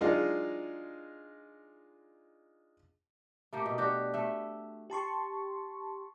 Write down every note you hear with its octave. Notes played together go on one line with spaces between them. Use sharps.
F#3 G#3 D4 D#4 F4 D#5
A3 A#3 G4
B2
D4 F#4 G4
A3 E5
G4 A5 C6 C#6